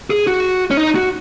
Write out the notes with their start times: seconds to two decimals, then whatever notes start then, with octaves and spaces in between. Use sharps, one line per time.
0.10 G#4
0.27 F#4
0.71 C#4
0.77 D#4
0.95 F#4